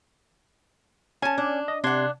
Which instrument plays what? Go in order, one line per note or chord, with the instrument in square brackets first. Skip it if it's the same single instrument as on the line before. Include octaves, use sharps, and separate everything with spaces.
[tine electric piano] C#4 G#6 [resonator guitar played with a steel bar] G#5 A5
[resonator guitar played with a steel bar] D4
[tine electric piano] D#5
[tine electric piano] C3 C6 G#6 [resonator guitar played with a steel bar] D4 F#5